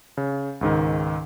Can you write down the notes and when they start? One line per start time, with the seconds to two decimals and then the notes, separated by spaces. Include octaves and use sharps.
0.17 C#3
0.61 C#2 G#2 D#3